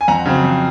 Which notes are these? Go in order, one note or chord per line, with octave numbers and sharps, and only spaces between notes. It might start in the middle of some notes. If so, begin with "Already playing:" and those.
G#5
F2 F#5 A#5
C#3 F#3 C4
F2